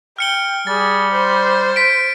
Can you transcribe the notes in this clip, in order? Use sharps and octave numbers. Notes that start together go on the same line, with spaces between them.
G5 F6 C#7 G7
G3 G#4 A6
C5
B6 D7